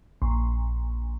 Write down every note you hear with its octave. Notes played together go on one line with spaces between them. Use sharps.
A#1